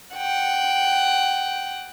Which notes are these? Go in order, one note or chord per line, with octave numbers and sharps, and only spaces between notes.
F#5 G5